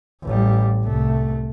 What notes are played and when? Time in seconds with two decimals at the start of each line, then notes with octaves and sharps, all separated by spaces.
0.24 A1 G3
0.84 C2 A3